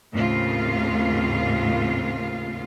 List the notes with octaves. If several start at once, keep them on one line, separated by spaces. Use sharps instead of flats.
D#2 A2 C#3 C4 F4 F5